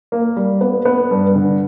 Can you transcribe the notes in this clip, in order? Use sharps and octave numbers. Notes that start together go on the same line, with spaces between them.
A#3
G3
B3
B3
G2
D3